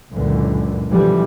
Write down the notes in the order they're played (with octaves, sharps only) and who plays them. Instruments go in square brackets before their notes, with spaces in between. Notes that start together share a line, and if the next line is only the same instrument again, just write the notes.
[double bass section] C#2 F#2 A#2 D3 E3
B2 D3 E3 F3 G3 A3